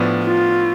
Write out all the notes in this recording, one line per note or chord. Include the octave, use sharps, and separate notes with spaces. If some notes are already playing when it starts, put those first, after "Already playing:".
Already playing: A2 F3 B3 D4
F4